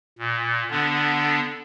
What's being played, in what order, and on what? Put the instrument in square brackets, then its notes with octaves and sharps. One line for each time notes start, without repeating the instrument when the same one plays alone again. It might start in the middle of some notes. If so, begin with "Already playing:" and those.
[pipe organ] A#2
D3 B3 D4